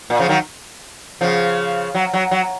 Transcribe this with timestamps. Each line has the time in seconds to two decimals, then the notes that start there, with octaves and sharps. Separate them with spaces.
0.10 A#2
0.20 C#3 F3
0.29 D#3 F#3
1.21 C#3 F3
1.95 F#3
2.13 F#3
2.31 F#3